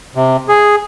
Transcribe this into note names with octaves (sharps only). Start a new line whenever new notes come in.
C3
G#4